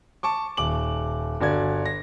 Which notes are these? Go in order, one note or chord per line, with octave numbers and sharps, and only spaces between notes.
A5 C#6 D6
D#1 D6 F#7
G1 F#4 D5 G#6
A#6